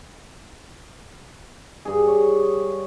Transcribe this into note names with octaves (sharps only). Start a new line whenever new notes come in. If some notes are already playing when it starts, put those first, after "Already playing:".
G2 G#4
C#5